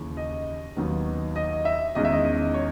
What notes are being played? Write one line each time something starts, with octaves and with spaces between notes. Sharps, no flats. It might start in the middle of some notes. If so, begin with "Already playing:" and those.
Already playing: D#2 C#3 E3
D#5
D#2 D#3 F#3 B3
D#5
E5
E2 D#3 G#3 C#4 D#5
E5
D#5
D#5
C#5